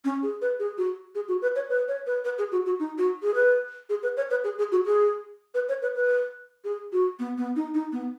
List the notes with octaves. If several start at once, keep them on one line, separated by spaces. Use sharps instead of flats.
C#4
G#4
B4
G#4
F#4
G#4
F#4
B4
C#5
B4
C#5
B4
B4
G#4
F#4
F#4
D#4
F#4
G#4
B4
G#4
B4
C#5
B4
G#4
G#4
F#4
G#4
B4
C#5
B4
B4
G#4
F#4
B3
B3
D#4
D#4
B3